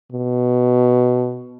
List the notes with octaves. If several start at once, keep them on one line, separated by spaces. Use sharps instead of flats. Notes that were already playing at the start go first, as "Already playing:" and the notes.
B2